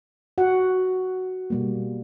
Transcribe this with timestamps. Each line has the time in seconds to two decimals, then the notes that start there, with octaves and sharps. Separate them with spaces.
0.38 F#4 F#5
1.50 B2 G3 A#3